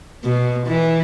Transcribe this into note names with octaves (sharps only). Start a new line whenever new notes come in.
B2
E3